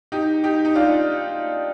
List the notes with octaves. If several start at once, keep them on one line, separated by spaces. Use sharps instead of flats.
D#4 G4
D#4 G4
D#4
D4 F4